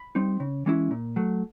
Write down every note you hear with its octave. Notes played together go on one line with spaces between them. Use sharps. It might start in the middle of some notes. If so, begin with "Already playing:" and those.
Already playing: B5
G3 C4 D#4
C#3
E3 G#3 C#4 E4
A#2
F#3 A3